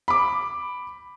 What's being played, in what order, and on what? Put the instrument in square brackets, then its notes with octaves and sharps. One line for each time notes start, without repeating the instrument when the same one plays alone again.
[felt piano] B5 D6